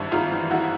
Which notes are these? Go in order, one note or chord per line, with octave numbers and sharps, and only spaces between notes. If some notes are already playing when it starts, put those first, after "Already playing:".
Already playing: G#1 G2 E4
G#1 D#4 F4
E3
G2 E4 F#4